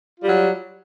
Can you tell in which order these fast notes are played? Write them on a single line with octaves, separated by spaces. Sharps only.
F4 G3 F#3